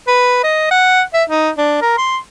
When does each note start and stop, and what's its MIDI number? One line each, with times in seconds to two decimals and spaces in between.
0.08 0.39 71
0.43 0.66 75
0.71 1.02 78
1.14 1.23 76
1.30 1.50 63
1.58 1.81 62
1.82 1.97 70
1.98 2.18 84